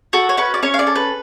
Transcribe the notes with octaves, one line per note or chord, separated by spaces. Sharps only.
F#4 A4
C#5
C#4 B4
D5
C#4 C#5
F5
D5
A4
B4